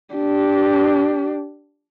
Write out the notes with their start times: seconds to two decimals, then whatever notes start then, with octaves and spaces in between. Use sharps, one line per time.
0.14 D4 G4